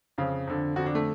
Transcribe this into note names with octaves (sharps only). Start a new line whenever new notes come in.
F2 C#3
F2 D3
F2 D3 F#4
D4
A3